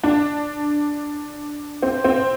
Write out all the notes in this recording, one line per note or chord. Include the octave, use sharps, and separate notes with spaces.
D4
C4
C4